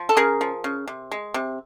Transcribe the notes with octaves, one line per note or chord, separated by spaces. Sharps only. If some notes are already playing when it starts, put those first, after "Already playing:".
Already playing: F3
A4
C#3 G#4 A#4
F3
C#3
C3
G#3
C3